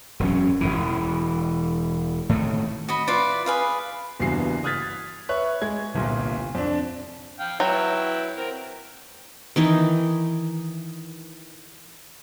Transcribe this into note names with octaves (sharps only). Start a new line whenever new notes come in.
E1 F#2 C#4
E1 C2 E3
A2 D#3 A3
F#4 D#5 B5
E4 F4 B4 D5
G#4 B4 F5
F#1 E2 G2 F#4 C7
D#6 F6 F#6 G#6 A6 B6
B4 C#5 E5 C#6 F#6
G#3 G#6
G1 C2 A#2
F2 D4
F5 G5
F#3 E4 B4 G5
C4 A#4
D#3 E3 D#4